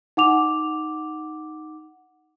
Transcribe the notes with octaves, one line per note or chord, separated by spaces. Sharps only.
D#4 F#5 D6 F7